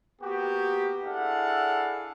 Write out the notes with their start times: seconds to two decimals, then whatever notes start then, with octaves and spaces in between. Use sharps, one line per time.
0.21 A#3 B3 F#4 G4
1.04 D4 E4 G#4 A4 F5 F#5